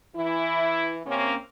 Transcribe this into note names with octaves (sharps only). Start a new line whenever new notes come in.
E3 E4
C3 A#3 C4 C#4